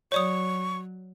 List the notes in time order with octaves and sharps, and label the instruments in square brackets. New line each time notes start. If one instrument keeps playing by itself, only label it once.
[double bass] F#3 [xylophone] C#5 D5 D#6 [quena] C#6